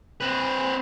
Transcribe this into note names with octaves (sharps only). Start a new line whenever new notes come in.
C4 B4